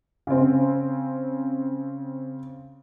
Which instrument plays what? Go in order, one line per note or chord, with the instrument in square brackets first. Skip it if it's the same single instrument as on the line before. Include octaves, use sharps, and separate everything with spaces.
[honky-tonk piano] C#3 C4